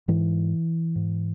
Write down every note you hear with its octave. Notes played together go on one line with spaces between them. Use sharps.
G#2 E3
G#2